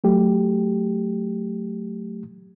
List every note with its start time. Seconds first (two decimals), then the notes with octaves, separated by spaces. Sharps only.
0.04 F#3 A3 G4